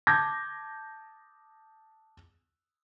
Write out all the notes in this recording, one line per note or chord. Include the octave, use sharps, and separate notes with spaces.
A5 D6 G6 G#6 A#6